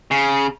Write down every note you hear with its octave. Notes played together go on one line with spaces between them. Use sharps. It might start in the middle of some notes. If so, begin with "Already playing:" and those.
C#3